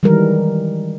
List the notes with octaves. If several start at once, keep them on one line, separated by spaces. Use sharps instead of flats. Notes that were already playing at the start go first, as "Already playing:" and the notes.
D#3 E3 G3 G#3 A#4